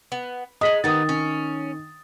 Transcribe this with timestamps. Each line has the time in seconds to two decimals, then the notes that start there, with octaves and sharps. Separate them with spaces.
0.12 B3
0.61 G#3 D#4 D#5 D#6 B6 F#7
0.84 D#3 B3 D#4 G4 D#6 A6
1.09 C#4